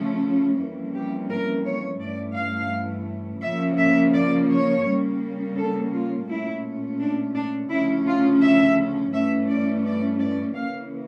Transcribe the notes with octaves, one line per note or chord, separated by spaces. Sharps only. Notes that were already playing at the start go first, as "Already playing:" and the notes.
Already playing: C#3 F3 A3 C#4
F2 E3 G3 A#3 C#4
G4
A#4
C#5
G2 E3 A3 C#4 D5
F5
C#3 F3 A#3 C#4 E5
E5
D5
C#5
C#3 G3 A#3 C#4
A4
F4
A#2 A3 C#4 E4
D4
D4
D2 C#3 F3 C#4 E4
F4
E5
G2 E3 A3 C#4 E5
D5
D5
D5
C#3 E3 A#3 C#4 F5